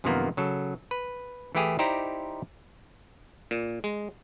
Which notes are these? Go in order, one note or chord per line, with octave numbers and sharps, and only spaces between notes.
F#2 C3 D#3 F3 A#3 B3
C#3 F#3 A4
B4
E3 A3 E4 G4 G#4
D#4 E4 G4 C5 D5 A#5
A#2
G#3